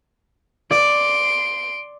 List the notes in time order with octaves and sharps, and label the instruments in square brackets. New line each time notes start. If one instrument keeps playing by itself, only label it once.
[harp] D5 [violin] C6 D7